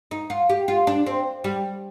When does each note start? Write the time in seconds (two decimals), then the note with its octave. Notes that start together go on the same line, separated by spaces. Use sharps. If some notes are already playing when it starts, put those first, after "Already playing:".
0.11 D#4
0.30 F4
0.49 G4
0.68 F4
0.87 D4
1.06 C4
1.44 G3